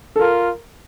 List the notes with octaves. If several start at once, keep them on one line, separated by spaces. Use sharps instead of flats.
A4
F4 A#4